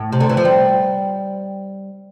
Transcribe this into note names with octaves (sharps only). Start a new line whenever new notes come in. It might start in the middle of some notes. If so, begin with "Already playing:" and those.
Already playing: A2
C3
D3
E3
F3
G3